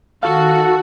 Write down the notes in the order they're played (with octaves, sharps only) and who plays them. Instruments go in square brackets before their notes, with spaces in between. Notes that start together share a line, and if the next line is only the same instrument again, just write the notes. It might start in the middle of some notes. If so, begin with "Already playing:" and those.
[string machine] D#3 [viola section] F#4 [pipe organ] A4 [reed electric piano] F5